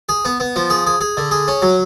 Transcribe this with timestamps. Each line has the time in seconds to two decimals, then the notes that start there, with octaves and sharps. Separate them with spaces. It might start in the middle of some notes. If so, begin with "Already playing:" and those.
0.09 G#4
0.25 B3
0.40 B3
0.56 F3
0.70 G#4
0.87 G#4
1.01 G#4
1.17 D3
1.31 G#4
1.48 C#4
1.62 F#3